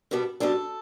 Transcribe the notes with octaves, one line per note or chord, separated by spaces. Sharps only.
B2 G3 B3 D4
B2 G3 B3 D4 A4